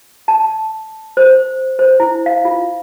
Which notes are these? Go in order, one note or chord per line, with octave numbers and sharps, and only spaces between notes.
A5
C5
C5
E4
F5
F4